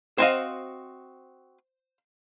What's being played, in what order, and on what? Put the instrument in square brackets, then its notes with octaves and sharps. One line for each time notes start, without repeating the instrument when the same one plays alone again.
[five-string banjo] C4 F#4 D#5 [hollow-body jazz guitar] C5 F5